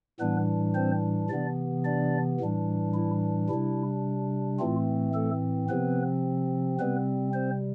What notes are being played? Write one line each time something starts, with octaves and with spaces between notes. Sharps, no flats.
A2 E3 G3 B3 D4 B4
C4 C5
C3 E3 B3 D4 D5
D4 D5
A2 E3 G3 D4
E4
C3 G3 D4 E4
A2 E3 A3 C4 F4
A3 A4
C3 F3 B3 C4 B4
C3 G3 B3 C4 B4
C4 C5